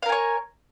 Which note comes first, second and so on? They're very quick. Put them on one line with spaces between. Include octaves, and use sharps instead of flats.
F5 A#4 G#5 C#5